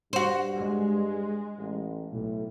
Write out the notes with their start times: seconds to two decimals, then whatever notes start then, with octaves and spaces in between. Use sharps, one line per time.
0.13 G2 F#4 C5
0.55 G#3
1.58 A1
2.12 B1 A2